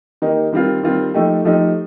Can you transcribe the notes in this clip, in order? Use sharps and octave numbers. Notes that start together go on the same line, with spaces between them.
D#3 A#3 D#4 G4
D#3 G3 C4 F4
D#3 G3 C4 F4
F3 A3 D#4 G4
F3 A3 D#4 G4